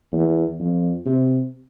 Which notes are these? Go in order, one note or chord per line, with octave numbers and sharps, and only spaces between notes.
E2
F2
C3